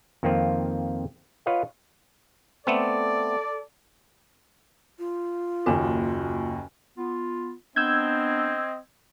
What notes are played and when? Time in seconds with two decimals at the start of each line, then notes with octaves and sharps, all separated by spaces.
0.23 F2 D#3 A#3 C4 F4
1.46 F4 B4 C#5 D#5 F5 F#5
2.67 A3 B3 C4 A4 D5
4.99 F4
5.66 F#1 D#2 F#4 G#5
6.98 B3 F4
7.76 B3 C4 D4 D#5 E6 G6 G#6